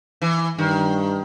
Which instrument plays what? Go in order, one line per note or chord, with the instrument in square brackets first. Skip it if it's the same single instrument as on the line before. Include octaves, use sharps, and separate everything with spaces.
[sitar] E3
[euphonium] G2 [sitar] D#3